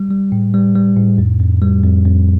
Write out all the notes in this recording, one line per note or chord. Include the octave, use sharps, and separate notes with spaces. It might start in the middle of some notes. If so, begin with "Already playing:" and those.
Already playing: G3
G3
A2
G3
G3
A2
F2
F2
G3
F2
F2